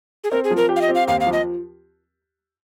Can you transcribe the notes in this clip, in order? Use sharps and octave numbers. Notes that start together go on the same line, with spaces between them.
G#4
C4 A#4
G#4
F3
A#4
G4
F5
D#5
C4
F5
D#2 F5
F5
F3
D#5